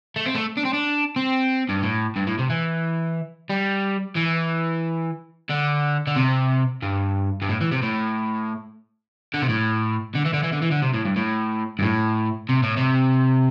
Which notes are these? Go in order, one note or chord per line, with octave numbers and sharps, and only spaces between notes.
A3
C4
A3
D4
C4
D4
C4
G2
A2
G2
A2
C3
E3
G3
E3
D3
D3
C3
G2
G2
A2
E3
C3
A2
D3
C3
A2
D3
E3
D3
E3
D3
E3
D3
C3
A2
G2
A2
G2
A2
C3
A2
C3